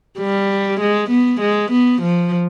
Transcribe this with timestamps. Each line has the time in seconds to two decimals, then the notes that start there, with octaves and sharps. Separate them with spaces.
0.19 G3
0.80 G#3
1.10 B3
1.41 G#3
1.71 B3
2.02 F3